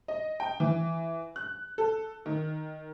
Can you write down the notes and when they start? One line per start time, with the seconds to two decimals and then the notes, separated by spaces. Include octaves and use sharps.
0.08 D#5
0.40 G5
0.60 E3
1.36 F#6
1.78 A4
2.26 D#3